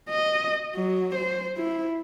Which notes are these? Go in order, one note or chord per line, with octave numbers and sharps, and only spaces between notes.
D#5
F#3
C5
E4